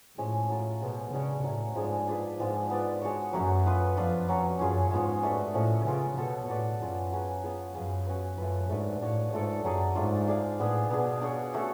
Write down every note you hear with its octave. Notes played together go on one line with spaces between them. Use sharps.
A2 F3 G#3 C#4
F#3 A3 F4
B2 F3 G#3 B3
C#3 G#3 D4 F#4 C#5
A2 F#3 A3 C#4
G#2 F3 G#3 D4 G#4
D4 F4 G#4 B4
G#2 F3 G#3 B3 F4
B3 F4 B4 D5
G#3 D4 F#4 C#5
F#2 F#3 A3 C#4 F#4
B3 F4 B4
F2 D4 F4 B4 F5
F#3 C#4 F#4 C#5
F#2 C#4 F4 G#4
G#2 G#3 B3 F4
A3 D4 F#4 B4
A2 F3 A3 C#4
C#3 G#3 B3 F4
B2 B3 F#4 A4 C#5
A2 B3 F#4 B4 D5
F#2 C#4 F4 G#4
F#3 C#4 G#4 B4
B3 F4 G#4
F#2 C#4 G#4 B4 F5
C#4 F#4 B4
F#2 A3 F4 B4
G#2 A3 D4 F#4 B4
A2 D4 F#4 C#5 F5
G#2 A3 F4 A4 D5
F#2 F#3 C#4 G#4 D5
G#2 A3 D4 F4
D4 G#4 D5 F5
A2 G#3 B3 D4 G#4
B2 B3 D4 G#4
D4 G#4 C#5
A3 C#4 F#4 A4